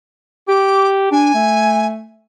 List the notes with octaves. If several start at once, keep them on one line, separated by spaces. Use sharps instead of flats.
G4 D6
D4 G#5
A3